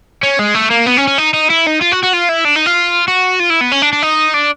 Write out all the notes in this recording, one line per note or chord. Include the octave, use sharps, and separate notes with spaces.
C#4
G#3
A3
A#3
B3
C#4
C#4
D#4
D#4
E4
D#4
F4
F#4
F#4
F4
E4
D4
D#4
F4
F#4
F4
E4
B3
C#4
D4
D4
D#4
D4